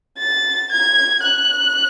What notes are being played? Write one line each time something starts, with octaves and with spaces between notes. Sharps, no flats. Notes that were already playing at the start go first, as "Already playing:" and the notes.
A6
G#6
F#6